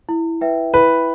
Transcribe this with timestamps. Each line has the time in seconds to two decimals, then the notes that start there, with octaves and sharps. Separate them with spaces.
0.09 E4
0.41 B4 E5 G5
0.74 E4 B4